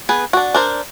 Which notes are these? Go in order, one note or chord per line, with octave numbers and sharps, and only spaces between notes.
B3 G#4 B4
D4 F#4
D4 A#4 C5